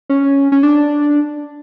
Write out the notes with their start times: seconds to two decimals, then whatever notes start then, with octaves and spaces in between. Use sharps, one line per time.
0.09 C#4
0.52 C#4
0.63 D4